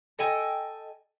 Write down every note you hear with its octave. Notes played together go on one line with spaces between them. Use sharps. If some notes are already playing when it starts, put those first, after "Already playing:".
A4 D#5 G5 G#5